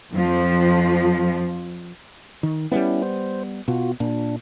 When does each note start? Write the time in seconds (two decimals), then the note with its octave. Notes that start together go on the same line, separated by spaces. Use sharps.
0.12 F2 F3
2.43 D#3
2.72 G3 A#3 B3 C#4 E4
3.02 C5
3.68 B2 F4 F#4
4.00 A#2 D4